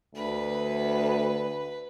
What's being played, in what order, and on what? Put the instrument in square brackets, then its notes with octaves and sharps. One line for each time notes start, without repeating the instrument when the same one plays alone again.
[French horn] D2 [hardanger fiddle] B4